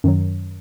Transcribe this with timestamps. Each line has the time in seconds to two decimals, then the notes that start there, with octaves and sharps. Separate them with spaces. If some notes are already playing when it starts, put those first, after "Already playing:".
0.04 F#2 D#3 F#3